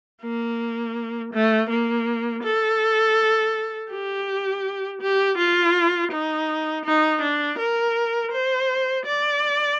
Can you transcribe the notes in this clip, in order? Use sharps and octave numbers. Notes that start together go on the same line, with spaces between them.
A#3
A3
A#3
A4
G4
G4
F4
D#4
D#4
D4
A#4
C5
D5